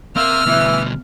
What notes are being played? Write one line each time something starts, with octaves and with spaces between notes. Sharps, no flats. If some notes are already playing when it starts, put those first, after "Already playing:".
A#3 C4 E5 E6 F6
D2 B2 E3